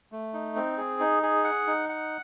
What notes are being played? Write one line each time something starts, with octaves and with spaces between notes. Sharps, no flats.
A3
D#4
C4
G#4
D#4
G#4
F#5
D#4
F#5